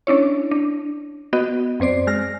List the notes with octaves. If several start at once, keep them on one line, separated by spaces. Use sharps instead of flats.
C#4 D4 E4 C#5
D4
B3 F#4 D#5
F#2 C4 C5 D5 C7
G#3 F6 A#6